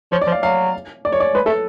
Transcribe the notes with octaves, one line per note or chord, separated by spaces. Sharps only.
F3 C#5
D5
F3
F5
F#3 F5
D5
C#5
D5
G#3 B4
A3 A4